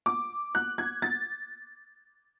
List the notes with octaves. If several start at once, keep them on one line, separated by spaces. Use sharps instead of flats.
D6
F#6
G#6
A6